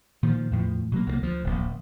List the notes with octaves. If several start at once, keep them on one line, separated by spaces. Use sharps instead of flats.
A#2 D#3 F3
E2 A2 F3
B2 F#3 A#3
C2 F#3 A#3
D2 F3
D1 A#1